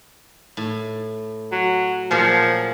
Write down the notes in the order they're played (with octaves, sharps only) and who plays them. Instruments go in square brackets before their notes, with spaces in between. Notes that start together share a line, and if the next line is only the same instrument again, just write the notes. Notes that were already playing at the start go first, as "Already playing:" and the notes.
[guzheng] A2
[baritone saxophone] F#3
[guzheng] A#2 F#3 G#4 [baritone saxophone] F3